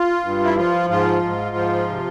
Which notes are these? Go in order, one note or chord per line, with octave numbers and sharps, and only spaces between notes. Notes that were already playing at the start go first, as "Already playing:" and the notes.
Already playing: F4
G2
E4
F3 F4
G#2 F4
G#2
F3
C3